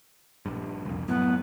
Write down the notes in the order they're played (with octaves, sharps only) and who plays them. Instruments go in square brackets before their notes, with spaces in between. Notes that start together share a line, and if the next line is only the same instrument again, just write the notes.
[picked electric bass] A#1 G2
C2 F2
[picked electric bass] F#2 A2 [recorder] B3